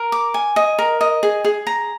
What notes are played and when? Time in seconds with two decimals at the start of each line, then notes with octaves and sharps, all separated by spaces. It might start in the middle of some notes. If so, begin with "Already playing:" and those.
Already playing: A#4
0.12 D6
0.34 G#5
0.56 D#5
0.79 A#4
1.01 D#5
1.23 G#4
1.44 G#4
1.67 A#5